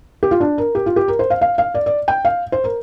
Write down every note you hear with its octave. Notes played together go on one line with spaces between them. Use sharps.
G4
F4
D4
A#4
G4
F4
G4
A#4
C5
F5
F5
F5
D5
D5
G5
F5
C5
A#4